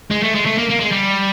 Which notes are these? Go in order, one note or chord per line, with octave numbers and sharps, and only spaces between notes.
G#3
A3
G#3
A3
A#3
A#3
G#3
G3